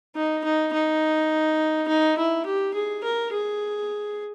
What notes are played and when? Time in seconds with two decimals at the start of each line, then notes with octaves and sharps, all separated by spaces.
0.16 D#4
0.44 D#4
0.73 D#4
1.88 D#4
2.18 E4
2.46 G4
2.74 G#4
3.04 A#4
3.33 G#4